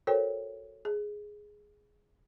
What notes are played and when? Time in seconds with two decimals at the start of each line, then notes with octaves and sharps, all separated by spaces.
0.07 F#4 A4 A#4 C5 C#5 G5
0.85 G#4